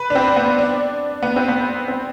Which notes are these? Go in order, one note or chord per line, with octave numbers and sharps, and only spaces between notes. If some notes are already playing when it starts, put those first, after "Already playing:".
Already playing: B4
D4
C4
B3
D4
B3
C4
B3
C4